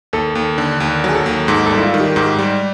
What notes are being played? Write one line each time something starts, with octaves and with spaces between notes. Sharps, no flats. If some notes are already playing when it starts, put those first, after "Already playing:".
D#2 A4
D#2
D3
D#2
F#3
G#4
A4
D#2
G#2 A4
G3 A4
E4
F4
D#3
G4
G#2 G4
G3